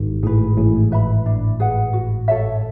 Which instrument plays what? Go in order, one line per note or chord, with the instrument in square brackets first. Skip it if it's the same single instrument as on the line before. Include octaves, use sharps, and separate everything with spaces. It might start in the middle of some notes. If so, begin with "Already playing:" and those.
Already playing: [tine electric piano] G#1 G#2
[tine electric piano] A1 A2 [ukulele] G#4 B4
[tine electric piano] A1 A2 [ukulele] G#4
[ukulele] B4 E5 B5
D4
G#4 B4 F#5
F#4
A4 C#5 E5